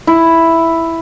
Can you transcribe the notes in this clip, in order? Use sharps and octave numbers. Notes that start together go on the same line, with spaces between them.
E4